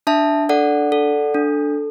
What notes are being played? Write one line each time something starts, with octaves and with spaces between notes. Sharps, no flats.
D4 E5 A5
A4 D5 F#5
A4
D4